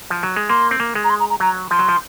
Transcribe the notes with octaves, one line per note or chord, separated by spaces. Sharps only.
F3
F#3
G#3
A#3 C6
C4
A#3
G#3
A#5
C6
A#5
A#5
F#3 A#5
F3 C6
F#3
F3